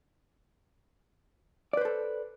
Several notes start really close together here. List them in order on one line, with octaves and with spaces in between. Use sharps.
D5 B4 C5 A4